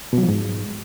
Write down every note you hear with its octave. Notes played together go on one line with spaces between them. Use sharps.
B2
F#3
F3
G#2